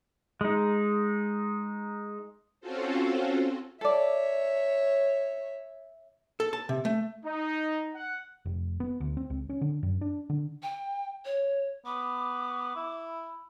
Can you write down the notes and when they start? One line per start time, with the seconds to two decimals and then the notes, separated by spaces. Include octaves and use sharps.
0.41 G#3 D#4
2.61 C4 C#4 F4 F#4 A4 C5
3.81 A4 C#5 D5 E5
6.40 A4
6.53 A5
6.69 C3
6.85 A3
7.25 D#4
7.95 F#5
8.45 F1
8.80 B3
9.00 D2
9.17 C4
9.30 C#2
9.49 C#4
9.61 D3
9.83 F#2
10.01 D4
10.30 D3
10.63 G5
11.25 C#5
11.86 B3 D6
12.76 E4